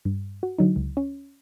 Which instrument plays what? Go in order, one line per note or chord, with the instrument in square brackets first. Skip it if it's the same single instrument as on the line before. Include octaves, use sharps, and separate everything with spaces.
[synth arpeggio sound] G2
F#4
D3 F#3 D#4
C#2
C#4